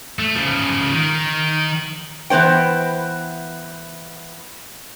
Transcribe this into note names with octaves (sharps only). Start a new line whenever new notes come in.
A3
C#3 F3
D#3
E3 B3 C5 G5